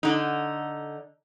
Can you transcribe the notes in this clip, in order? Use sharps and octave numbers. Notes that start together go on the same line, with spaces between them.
D3 D#4